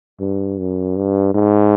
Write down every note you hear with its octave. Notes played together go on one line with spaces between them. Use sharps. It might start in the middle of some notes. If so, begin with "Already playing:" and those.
G2
F#2
G2
G#2